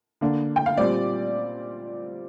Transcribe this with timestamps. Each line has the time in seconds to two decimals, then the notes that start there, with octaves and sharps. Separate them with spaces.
0.21 D3 A#3 D4
0.56 G5
0.66 F5
0.77 A#2 G3 C4 D5